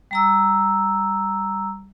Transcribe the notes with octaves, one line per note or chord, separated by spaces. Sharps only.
G3 A#5 E6